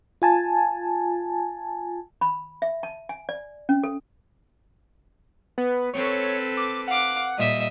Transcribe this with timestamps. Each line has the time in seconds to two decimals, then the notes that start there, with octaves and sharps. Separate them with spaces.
0.22 F4 G#5 A5
2.21 B5
2.62 E5
2.83 A5
3.09 G#5
3.29 D5
3.69 C#4
3.84 A4
5.58 B3
5.94 C4 A4 B4 C#5
6.57 D6
6.88 F5 F#5 D6
7.38 A#2 G3 D#5 E5